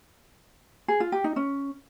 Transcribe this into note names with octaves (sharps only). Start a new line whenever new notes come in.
G#4
F4
G4
D#4
C#4